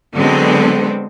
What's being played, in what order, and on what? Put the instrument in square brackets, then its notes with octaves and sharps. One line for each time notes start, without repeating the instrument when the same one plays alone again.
[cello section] D3 F#3 G#3 B3 C4